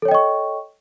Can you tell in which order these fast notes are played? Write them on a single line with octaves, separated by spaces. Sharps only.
A4 C#5 G5 D#5 C#6